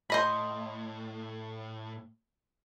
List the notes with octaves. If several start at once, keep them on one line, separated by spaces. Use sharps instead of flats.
A2 C5 D#5 B5